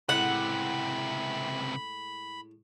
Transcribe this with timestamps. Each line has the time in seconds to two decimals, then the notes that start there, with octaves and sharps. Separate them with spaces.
0.09 C#2 A2 C3 G#3 F#5 B5